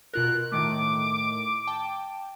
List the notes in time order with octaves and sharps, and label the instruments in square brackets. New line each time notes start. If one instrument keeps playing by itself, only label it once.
[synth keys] B2 F4 A#4 [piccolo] F#6
[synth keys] A2 D#3 A3 [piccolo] D6
[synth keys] G5 A5